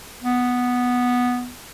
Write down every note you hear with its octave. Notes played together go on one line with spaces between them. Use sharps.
B3